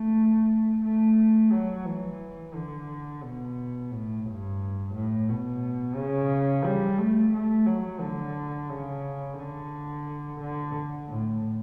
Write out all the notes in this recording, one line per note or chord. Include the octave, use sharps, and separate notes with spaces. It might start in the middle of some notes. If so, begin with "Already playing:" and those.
Already playing: A3
A3
F#3
E3
D3
B2
A2
G2
A2
B2
C#3
G3
A3
A3
F#3
D3
C#3
D3
D3
A2